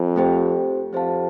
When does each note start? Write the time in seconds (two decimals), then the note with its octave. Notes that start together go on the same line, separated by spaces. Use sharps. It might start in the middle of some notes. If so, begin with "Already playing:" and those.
Already playing: F2
0.16 A3 C4 G4 C5 G5
0.93 F2 C4 G4 C5 F5 A5